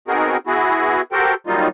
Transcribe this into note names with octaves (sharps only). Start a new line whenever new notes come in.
B3 C4 D#4 F#4 G#4 A#4
B3 E4 F#4 G#4
F#4 G4 A4 A#4 C5 G5
D#3 F#3 G3 A#3 D#4 F4